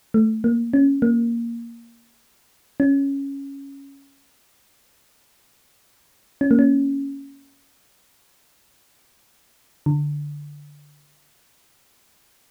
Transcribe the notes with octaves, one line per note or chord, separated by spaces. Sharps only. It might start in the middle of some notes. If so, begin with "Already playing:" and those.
A3
A#3
C#4
A#3
C#4
C#4
A#3
C#4
D3